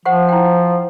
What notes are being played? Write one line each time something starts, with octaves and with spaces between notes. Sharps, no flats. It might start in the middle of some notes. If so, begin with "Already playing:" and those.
F3 C5 F#5 C#6
E4 G5